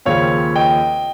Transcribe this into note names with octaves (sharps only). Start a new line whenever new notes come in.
D#2 C#3 F3 C4 C#5 F5
D#5 G5